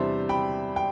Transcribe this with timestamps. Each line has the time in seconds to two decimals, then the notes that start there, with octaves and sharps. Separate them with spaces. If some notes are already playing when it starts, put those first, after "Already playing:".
Already playing: E2 C3 G3 D4 C5 E5
0.29 G5 B5
0.76 G5